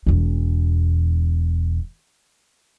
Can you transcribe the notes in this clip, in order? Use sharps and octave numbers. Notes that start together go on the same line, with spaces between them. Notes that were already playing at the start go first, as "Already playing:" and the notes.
E1 E2